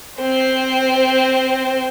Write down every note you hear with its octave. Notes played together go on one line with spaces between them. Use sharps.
C4 C5